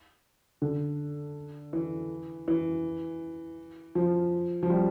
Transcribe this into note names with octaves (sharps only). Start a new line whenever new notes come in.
D3
E3
E3
F3
F3
G3